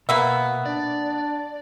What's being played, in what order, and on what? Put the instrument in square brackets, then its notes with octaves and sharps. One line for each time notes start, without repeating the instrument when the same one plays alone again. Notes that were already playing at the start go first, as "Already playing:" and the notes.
[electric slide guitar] B2 [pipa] A#3 B3 E5
[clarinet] D4 [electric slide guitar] D5